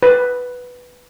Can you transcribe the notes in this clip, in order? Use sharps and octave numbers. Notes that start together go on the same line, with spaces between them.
B4